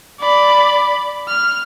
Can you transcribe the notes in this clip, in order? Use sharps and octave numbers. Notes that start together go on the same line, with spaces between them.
D5 B5
F6